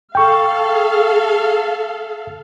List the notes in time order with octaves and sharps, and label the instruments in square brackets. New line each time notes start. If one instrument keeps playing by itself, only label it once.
[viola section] A4 F5 [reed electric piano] G5 C#6